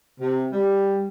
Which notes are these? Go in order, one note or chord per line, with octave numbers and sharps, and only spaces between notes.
C3
G3